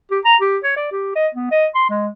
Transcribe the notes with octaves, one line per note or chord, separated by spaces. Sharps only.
G4
A#5
G4
C#5
D5
G4
D#5
B3
D#5
C6
G#3